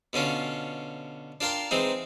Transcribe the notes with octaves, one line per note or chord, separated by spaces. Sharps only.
B2 D3 C#4 F4
D4 F4 A#4 G5 C6
E3 G#3 C4 D#4